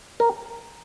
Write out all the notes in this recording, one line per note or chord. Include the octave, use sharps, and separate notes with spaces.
A#4